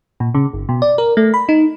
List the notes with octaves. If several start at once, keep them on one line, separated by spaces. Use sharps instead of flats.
A#2
C#3
G1
B2
D5
A#4
A3
B5
D#4